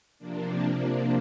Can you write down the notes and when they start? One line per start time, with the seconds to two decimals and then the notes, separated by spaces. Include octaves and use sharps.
0.19 C3 F3 A#3 D4